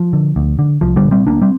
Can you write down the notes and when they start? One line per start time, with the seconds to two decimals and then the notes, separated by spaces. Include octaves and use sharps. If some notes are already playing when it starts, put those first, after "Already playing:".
Already playing: F3
0.13 D3
0.36 D2
0.59 D3
0.81 C2 F3
0.96 D3 G3
1.04 A#2
1.11 G3 C4
1.27 D2 A#3 D4
1.42 G3 C4